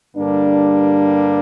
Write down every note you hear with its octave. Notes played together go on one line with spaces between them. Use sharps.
G2 D3 G3 A#3 D4